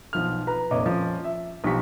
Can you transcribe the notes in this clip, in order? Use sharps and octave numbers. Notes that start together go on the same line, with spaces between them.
B1 F3 F6
B4 A#5
F1 A#2 C#5 D#5 D6
F3 C#4
E5
B1 F3 G4 C#6 B6